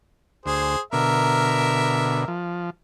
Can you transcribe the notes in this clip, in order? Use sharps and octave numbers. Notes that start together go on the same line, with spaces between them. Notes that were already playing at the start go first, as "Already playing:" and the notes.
D2 G#4 C5
B2 D3 A#4 E5
F3